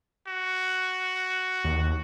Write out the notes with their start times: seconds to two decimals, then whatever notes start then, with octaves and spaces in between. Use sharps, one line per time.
0.27 F#4
1.65 D#2